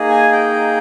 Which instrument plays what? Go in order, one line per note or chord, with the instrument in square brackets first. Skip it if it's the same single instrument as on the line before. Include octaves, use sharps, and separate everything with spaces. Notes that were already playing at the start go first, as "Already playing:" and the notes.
Already playing: [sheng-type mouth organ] A#3 D#4 G#4
G#5
G5